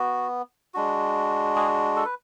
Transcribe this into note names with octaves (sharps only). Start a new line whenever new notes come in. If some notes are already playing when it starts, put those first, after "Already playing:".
Already playing: B3 F#4
G#3 D4 F#4
G#4
A4
B4